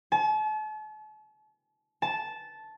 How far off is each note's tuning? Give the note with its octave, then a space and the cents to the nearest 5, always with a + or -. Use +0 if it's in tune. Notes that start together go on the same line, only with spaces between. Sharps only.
A5 -40
A5 -10